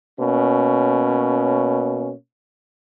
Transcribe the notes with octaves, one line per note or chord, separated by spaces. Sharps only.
B2 A#3 C#4